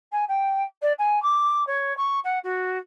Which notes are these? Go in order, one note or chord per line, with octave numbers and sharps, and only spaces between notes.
G#5
G5
D5
G#5
D6
C#5
C#6
F#5
F#4